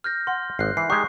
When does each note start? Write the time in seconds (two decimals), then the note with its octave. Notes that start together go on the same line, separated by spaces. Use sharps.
0.04 F6 G6 A#6
0.27 F#5 C6
0.59 G#1 F#6 C7
0.77 E3 C7
0.90 G#3 D#4 G4 C#6 F#6 C7